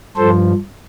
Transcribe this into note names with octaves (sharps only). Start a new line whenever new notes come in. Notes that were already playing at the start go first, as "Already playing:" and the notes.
G2 F3 A4 C5